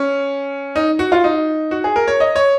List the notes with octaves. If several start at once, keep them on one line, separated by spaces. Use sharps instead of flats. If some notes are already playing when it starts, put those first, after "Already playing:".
Already playing: C#4
D#4
F#4
F4
D#4
F#4
G#4
A#4
C#5
D#5
C#5